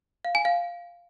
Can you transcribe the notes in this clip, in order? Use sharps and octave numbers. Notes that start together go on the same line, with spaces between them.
F5
G#5
F5